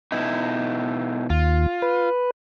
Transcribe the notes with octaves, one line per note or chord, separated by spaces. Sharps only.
B2 D#4 E4
D#2 F4
B4